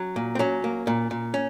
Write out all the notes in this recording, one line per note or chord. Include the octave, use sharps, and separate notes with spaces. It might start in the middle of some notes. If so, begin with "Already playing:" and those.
Already playing: F#3 C#4
A#2
C4
F#3 C#4
A#3
A#2
A#2
C#4